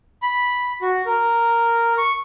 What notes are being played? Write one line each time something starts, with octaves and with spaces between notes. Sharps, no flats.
B5
F#4
A#4
C#6